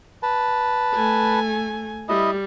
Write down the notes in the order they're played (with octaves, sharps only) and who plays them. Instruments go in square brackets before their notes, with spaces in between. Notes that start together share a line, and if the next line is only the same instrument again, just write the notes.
[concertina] B4 A5
[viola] A3 G#5
[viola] G3 [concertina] E4 D#5